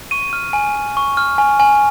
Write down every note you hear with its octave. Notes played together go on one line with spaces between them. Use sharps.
C#6 D#7
F6
G#5
G#5
C#6
F6
G#5
G#5